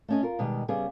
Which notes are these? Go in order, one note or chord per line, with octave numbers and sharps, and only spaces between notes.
A3 C#4 D#5
F4 A#4
B2 D#3 G3 G#3
C#3 G3 B3 G#4